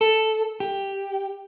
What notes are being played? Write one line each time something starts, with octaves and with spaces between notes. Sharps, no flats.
A4
G4